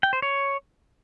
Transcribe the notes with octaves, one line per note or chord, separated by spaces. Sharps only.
G5
C5
C#5